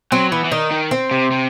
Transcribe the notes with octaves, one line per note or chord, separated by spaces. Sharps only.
F#3 C4
E3 B3
E3
D#3 D#4
D#3
C4
C3
C3